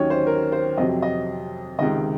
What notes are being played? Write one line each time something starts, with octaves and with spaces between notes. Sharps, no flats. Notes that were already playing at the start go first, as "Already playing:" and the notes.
Already playing: D#2 D#3 F#3 C#4 C#5
C5
A#4
C5
F2 C3 F#3 D#5
D#5
C#2 C3 D#3 D#5